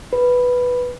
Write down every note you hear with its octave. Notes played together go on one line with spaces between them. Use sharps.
B4